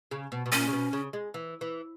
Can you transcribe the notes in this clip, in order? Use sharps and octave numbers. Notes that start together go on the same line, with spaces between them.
C#3
B2
B2
A#2 C#4
C#3
B2
C#3
G#3
E3
E3